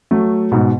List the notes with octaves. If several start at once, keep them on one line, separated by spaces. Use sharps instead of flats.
F#3 A3
G#2 B2